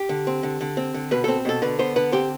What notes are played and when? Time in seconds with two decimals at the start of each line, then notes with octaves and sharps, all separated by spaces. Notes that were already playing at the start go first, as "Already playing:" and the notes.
Already playing: G4
0.09 D3
0.27 C4
0.43 D3
0.61 D3
0.77 C4
0.94 D3
1.11 B2 B4
1.24 C4 A4
1.45 B2 A4
1.62 D3 B4
1.79 B3 C5
1.96 D3 B4
2.12 C4 G4